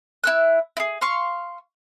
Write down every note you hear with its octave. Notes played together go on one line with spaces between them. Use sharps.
E4 E6 F#6
E4 G#4
F5 C6 C#6 F6